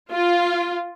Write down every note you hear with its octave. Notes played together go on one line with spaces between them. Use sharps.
F4